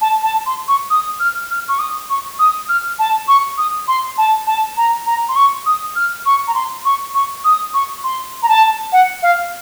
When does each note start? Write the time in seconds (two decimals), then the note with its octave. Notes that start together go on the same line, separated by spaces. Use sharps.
0.01 A5
0.23 A5
0.46 C6
0.68 C#6
0.90 D#6
1.20 F6
1.50 F6
1.68 C#6
1.79 D#6
2.10 C#6
2.39 D#6
2.69 F6
2.99 A5
3.28 C#6
3.58 D#6
3.88 C6
4.18 A5
4.47 A5
4.77 A#5
5.06 A#5
5.29 C6
5.36 C#6
5.66 D#6
5.96 F6
6.26 C#6
6.47 A#5
6.55 C6
6.85 C#6
7.14 C#6
7.44 D#6
7.74 C#6
8.04 C6
8.43 A#5
8.49 A5
8.92 F#5
9.23 F5